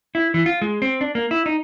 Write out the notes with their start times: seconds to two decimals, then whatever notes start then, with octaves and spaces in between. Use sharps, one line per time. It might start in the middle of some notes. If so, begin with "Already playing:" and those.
0.15 E4
0.34 E3
0.46 F4
0.62 G#3
0.82 C4
1.01 D4
1.15 A#3
1.31 E4
1.46 D#4